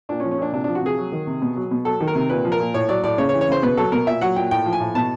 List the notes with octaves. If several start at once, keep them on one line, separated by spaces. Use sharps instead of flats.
A#2 D4
C#4
F3
C#4
A#2 D4
C3 D4
F3 D4
F#4
C3 G#4
F#3
D#3
C3
B2
F#3
B2
F#3 A4
D#3
A#4
C3
A#2 B4
F3
A#4
A#2
A2 C#5
F#3 D5
A2 D5
C#3 C#5
C#5
E3
C#5
C#3 C5
B2 B4
F#3 A4
B2 A#4
A#2 E5
F#3 F#5
A#2 G5
A2 G5
F3
G#5
A2
B2 A5